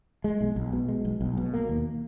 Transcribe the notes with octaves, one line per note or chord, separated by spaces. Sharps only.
G#3
B1
B1
B2
G#3
B1
B1
B2
A#3
D#2